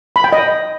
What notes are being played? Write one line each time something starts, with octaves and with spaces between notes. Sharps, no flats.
B5
G5
D#5